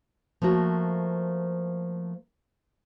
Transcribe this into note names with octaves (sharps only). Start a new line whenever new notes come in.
F3 A3 A#3 F#4